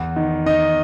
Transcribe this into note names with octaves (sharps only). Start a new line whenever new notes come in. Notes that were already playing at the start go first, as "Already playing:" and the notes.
Already playing: E2
D#3
D#3 D#5